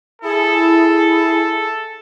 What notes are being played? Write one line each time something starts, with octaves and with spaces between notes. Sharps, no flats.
E4 G#4 A4